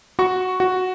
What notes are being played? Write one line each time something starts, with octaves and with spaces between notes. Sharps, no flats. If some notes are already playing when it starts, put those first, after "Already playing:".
F#4 C#6
F#4